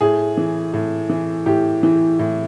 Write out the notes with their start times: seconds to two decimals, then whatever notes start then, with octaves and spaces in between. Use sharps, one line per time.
0.01 A2 G#4
0.37 E3
0.73 A2
1.09 E3
1.46 A2 G4
1.83 E3
2.19 A2